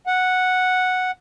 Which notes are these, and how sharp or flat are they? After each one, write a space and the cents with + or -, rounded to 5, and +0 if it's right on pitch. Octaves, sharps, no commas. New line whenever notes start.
F#5 -5